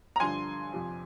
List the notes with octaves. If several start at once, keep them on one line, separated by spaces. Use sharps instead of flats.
A#5
G2 D3 F3 G#5 C6
F2 C3 F3